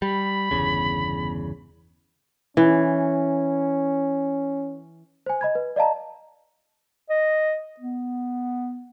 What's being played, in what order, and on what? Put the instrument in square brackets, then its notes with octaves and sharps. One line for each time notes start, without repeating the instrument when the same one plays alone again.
[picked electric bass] G3 [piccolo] B5
[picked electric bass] G1 E2 C#3
[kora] E3 [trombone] C#4
[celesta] C5 G#5
D#5 B5 G#6
B4
D5 D#5 F5 A5 A#5
[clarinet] D#5
B3